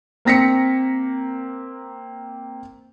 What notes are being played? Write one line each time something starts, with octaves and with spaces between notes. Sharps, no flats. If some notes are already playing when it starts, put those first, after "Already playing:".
A#3 C4 A#6 B6 C#7